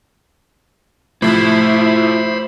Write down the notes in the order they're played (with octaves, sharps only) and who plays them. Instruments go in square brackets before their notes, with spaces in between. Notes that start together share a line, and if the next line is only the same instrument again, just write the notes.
[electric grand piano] A2 C3 F3 [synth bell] A3 [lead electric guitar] E4 [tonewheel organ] C5 B5